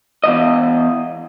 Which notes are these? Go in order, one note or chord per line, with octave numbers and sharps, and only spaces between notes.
E2 G2 D#5